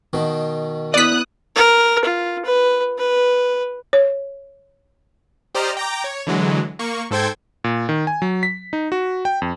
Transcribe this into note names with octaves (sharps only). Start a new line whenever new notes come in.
B2 D#3
B3 E4 D5 D#6 F#6 B6
A#4
F4
B4
B4
C#5
G4 C5 D5 D#5 A#5 F6
G5 A#5 D6
C#5
D3 E3 F#3 G#3
A#3 C#6
G#2 A4 C5 G5 G#6
A#2
D#3
G#5
F#3
B6
D#4
F#4
G5
F2